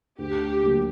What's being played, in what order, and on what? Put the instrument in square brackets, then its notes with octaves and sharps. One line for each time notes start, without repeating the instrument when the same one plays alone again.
[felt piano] D2 [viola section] G4
[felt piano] D3 F#3 A#3